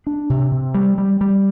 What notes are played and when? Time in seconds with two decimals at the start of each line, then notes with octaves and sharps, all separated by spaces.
0.07 D4
0.30 C3
0.51 C3
0.75 G3
0.98 G3
1.21 G3